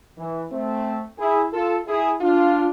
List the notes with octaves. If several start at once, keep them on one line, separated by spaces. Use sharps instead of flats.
E3
A3 C4
E4 G#4
F4 A4
E4 G#4
D4 F4